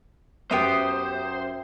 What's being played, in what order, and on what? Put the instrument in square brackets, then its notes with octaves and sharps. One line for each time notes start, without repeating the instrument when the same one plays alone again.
[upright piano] F#2 [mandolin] B3 G4 D#6 [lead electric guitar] C5 [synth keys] E5 G5